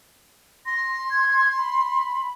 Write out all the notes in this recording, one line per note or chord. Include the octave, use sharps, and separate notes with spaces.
C6 A#6
G#6
B5